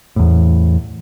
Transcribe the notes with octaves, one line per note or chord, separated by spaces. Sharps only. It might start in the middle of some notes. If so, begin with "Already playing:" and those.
E2 A2